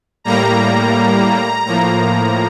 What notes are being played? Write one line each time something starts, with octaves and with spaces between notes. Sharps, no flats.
A2 G3 A#3 A#5
A2 F3 A#3 A#5